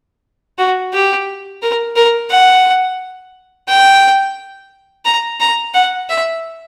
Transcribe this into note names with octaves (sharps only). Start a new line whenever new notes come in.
F#4
G4
A#4
A#4
F#5
G5
A#5
A#5
F#5
E5